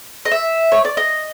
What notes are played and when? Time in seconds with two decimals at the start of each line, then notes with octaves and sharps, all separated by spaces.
0.25 D#5
0.32 E5
0.72 C#5
0.85 D5
0.97 D#5